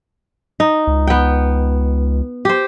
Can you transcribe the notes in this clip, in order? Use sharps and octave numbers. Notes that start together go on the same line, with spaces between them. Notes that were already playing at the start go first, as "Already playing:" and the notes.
D#4
C#2
B3 G5
G4 C5